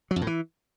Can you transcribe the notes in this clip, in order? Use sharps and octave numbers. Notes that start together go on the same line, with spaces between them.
F#3
F2
A2
E3